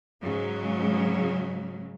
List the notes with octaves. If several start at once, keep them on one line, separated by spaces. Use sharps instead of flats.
G#2 C#3 F#3 G#3